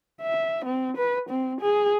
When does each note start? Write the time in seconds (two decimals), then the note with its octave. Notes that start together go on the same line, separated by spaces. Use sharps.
0.21 E5
0.65 C4
0.97 B4
1.30 C4
1.61 G#4